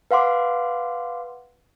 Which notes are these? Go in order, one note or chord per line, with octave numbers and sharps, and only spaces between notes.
B4 F5 F#5 C6 D6